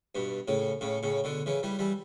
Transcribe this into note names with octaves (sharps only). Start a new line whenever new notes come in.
G2 B2
A2 C#3
A2 C#3
A2 C#3
B2 D3
C#3 E3
E3 G3
E3 G3